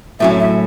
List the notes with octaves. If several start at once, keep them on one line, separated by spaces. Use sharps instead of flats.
A2 F#3 C#4 E5
E5